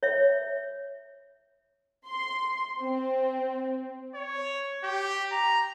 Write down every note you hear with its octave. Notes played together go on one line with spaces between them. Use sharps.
C#5 E5
C6
C4
C#5
G4
A#5